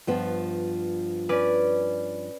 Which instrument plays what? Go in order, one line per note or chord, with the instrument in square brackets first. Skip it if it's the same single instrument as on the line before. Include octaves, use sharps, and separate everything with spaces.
[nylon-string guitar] G2 F3 B3
[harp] C#4 B4 D5